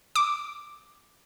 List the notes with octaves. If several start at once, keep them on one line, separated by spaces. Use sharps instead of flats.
D6